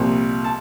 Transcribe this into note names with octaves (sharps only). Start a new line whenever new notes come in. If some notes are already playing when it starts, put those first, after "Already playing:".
Already playing: C2 A#2 F3
A5